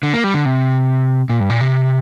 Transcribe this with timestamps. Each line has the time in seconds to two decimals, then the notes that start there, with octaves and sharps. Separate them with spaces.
0.03 D3
0.14 A#3
0.24 G3
0.34 D3
0.45 C3
1.30 A#2
1.40 G2
1.50 A#2
1.61 C3